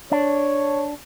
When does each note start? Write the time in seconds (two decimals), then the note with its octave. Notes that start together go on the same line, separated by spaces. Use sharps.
0.12 D4 C#5